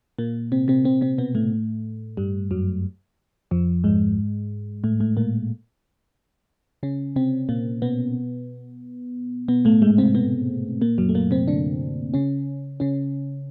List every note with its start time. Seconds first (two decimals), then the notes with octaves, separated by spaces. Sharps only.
0.19 A#2 A#3
0.52 C3 C4
0.68 C3 C4
0.85 C3 C4
1.01 C3 C4
1.18 B2 B3
1.35 A2 A3
2.17 G2 G3
2.51 F#2 F#3
3.51 F2 F3
3.84 G#2 G#3
4.84 A2 A3
5.00 A2 A3
5.17 A#2 A#3
6.83 C#3 C#4
7.16 C3 C4
7.49 A#2 A#3
7.82 B2 B3
9.48 B2 B3
9.65 A2 A3
9.82 G#2 G#3
9.98 C3 C4
10.15 B2 B3
10.81 A#2 A#3
10.98 F#2 F#3
11.09 A3
11.15 A#2 A#3
11.31 C3 C4
11.48 D3 D4
12.14 C#3 C#4
12.80 C#3 C#4